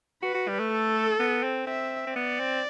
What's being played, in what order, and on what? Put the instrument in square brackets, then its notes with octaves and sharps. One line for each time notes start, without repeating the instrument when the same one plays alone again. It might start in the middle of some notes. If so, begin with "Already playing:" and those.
[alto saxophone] F#4 [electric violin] B4
[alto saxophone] F#4
G3
A3
[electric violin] A4
[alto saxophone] B3
C4
[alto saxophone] C4 [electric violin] E5
[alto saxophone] C4
[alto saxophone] B3 [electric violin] D5
[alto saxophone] C4